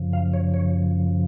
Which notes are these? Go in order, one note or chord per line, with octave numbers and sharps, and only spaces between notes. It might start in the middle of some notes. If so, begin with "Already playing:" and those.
Already playing: F#2 C#3 F3
F5
C#5
C#5